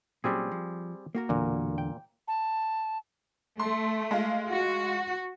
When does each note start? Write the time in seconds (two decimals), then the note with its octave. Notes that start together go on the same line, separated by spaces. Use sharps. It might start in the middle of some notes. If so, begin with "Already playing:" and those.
0.24 A#2 F#3 G3 C4 C#4 G#4
0.51 F3
1.15 A#3 F#4 A#4
1.29 E1 E2 A#2 D3
1.78 G5
2.28 A5
3.59 A3 C6
4.11 G#3 F4
4.48 F#4